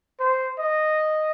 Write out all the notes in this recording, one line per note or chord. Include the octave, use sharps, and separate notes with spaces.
C5
D#5